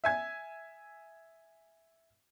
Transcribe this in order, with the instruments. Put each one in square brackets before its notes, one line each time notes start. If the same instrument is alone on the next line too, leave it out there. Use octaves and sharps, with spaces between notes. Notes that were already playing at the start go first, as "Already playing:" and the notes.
[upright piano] E5 G#5 G#6